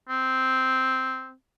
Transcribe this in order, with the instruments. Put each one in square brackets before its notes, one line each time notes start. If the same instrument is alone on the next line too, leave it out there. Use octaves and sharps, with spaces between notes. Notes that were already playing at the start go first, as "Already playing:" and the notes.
[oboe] C4